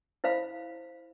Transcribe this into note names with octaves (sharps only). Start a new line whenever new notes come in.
E4 C5 F5 B5